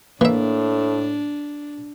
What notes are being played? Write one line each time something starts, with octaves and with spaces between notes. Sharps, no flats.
A2 E3 A#3 D4 E5